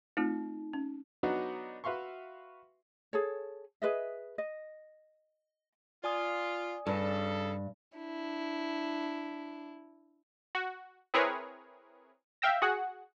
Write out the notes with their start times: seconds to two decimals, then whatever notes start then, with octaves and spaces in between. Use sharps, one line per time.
0.17 A3 C4 D#4 F4
0.73 C#4
1.23 F#3 B3 D4 D#4 F#4
1.84 F#4 B4 E5 F5 C6 C#6
3.13 G#4 A4 C#5
3.82 G#4 B4 D#5 E5
4.38 D#5
6.04 F4 D5 G#5 D#6
6.87 G2 C#3 A4
7.98 D4 E4
10.55 F#4
11.14 C4 E4 G#4 A#4 B4 C#5
12.42 E5 F5 G5 E6 A#6
12.62 F#4 G#4 F#5